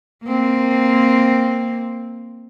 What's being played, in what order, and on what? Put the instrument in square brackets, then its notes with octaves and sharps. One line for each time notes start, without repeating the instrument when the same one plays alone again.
[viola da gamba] A#3 C4